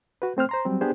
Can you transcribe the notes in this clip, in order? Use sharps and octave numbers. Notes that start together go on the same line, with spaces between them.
F#4 B4
A3 C4 C5 F6
C5 A#5 C6
F#3 G3 C4
B3 D4 G4 G#4 C5